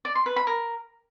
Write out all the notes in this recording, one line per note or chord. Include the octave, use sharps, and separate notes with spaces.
D5
C6
B4
B5
A#4